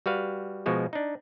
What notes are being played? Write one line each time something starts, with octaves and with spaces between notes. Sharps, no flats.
G3 F#4 B4 F5
B2 F3 G#3 F#4
D4 D#4